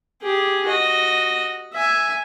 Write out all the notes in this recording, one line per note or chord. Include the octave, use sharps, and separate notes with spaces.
G4 G#4
F#4 D#5
E5 G#5